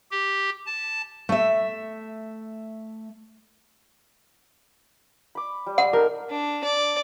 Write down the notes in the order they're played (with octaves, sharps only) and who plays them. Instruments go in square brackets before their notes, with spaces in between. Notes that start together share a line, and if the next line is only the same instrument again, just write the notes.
[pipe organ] G4
A5
[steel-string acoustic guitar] A3 E5
[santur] B5 D6
G3
[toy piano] F#5
[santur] D#4 A4 [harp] A#4
[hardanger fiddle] D4
D5